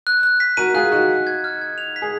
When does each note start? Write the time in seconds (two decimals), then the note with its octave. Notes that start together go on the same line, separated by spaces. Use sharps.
0.07 F#6
0.23 F#6
0.40 B6
0.57 F#4 A#4 D#7
0.74 F4 G#4 F#6
0.92 D#4 F#4 F#6
1.09 B6
1.27 G#6
1.44 F6
1.61 G#6
1.78 F7
1.96 B6
2.02 G#4